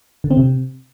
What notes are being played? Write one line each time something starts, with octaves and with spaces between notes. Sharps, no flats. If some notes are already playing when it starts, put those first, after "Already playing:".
D3
C4
C3